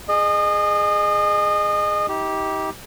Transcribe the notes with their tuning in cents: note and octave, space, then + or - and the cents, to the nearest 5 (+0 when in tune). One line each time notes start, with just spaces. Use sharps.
G#4 +0 D#5 -30
D#4 +35 G4 -5